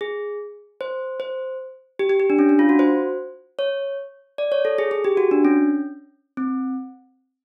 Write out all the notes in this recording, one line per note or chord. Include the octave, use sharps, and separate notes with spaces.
G#4
C5
C5
G4
G4
G4
D4
C#4
D4
F4
F#4
C5
C#5
D5
C#5
A4
G#4
G#4
G4
F#4
D4
C#4
C4